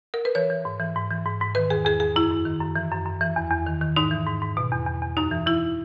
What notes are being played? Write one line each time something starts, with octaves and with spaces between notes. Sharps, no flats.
A#4
B4
E3 C#5
E3
G#2
E3
G#2
E3
G#2
G#2
D#3 B4
E2 G#4
E2 G#4
E2 G#4
F#2 E4
F#2
D#3
F#2
E3
F#2
F#2
E3
E2
E2
D#3
D#3
G#2 D#4
E3
G#2
G#2
B2
E2
E2
E2
F#2 D#4
E3
E3 E4